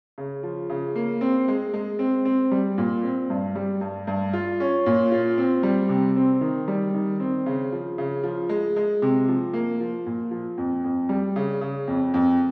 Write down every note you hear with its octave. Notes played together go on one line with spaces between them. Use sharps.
C#3
F3
C#3
A#3
C4
G#3
G#3
C4
C4
G3
A#2
C4
G2
G3
G2
G2
F4
C#4
A#2
F4
C4
G3
C3
C4
D#3
G3
D#3
C4
C#3
F3
C#3
F3
G#3
G#3
C3
F3
A#3
F3
A#2
F3
F2
F2
G3
C#3
C#3
F2
F2